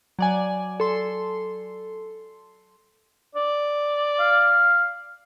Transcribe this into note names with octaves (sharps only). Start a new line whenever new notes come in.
F#3 D5 G#5
A4 C6
D5
F5